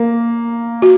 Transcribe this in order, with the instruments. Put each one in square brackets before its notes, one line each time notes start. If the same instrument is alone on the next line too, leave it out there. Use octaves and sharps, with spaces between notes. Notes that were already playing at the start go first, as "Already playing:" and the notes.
Already playing: [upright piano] A#3
[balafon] F#4